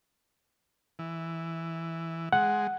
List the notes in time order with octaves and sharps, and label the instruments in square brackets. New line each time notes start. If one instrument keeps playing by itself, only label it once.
[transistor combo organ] E3
[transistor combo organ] G#3 [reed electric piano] F#5